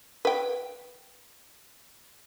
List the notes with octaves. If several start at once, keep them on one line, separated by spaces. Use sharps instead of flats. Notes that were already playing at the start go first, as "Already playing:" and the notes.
B4 G5